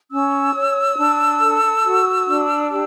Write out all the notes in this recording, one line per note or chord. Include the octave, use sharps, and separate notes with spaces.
C#4 E6
C#5
D4
A4
F#4
D4
G4 E6